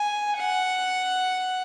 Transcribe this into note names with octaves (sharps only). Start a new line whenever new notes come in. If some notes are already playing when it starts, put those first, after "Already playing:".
Already playing: G#5
F#5